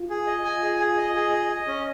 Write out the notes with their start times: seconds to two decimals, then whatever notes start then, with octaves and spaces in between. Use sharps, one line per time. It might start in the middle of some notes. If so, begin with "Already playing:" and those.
Already playing: F4
0.10 G#4
0.27 D#5
0.45 G#5
0.62 G#4
0.80 G#4
0.97 D#5
1.15 G#4
1.33 D#5
1.49 D#5
1.67 C#4